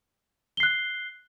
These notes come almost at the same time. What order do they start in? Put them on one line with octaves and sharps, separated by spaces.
G7 C7 F#6